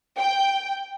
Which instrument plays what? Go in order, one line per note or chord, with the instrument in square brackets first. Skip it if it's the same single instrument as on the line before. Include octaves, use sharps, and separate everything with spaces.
[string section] G5